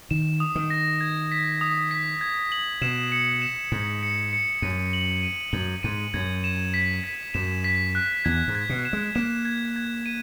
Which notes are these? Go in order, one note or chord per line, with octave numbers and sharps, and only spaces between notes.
D#3 E7
D#6
D#3
A#6
G#6
B6
D#6
B6
G#6
F#7
B2 E7
C#7
E7
G#2 C#7
C#7
C#7
F#2 D#7
F#7
D#7
F#2 F#7
G#2 D#7
F#2 G#6
E7
B6
B6
F#2 E7
B6
F#6
E2 G#6
G#2
G#6
B2
E7
G#3
A#3 E7
G#6
G#6
D#7